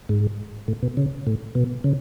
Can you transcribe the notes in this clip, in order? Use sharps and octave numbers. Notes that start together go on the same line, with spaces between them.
G#2
A2
B2
C#3
A2
B2
C#3